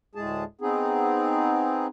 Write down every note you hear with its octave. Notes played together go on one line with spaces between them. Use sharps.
D2 A2 G#3 G#4 A5
B3 C4 D#4 G#4